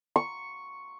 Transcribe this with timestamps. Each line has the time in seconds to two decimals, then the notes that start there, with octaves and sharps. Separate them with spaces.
0.16 C#6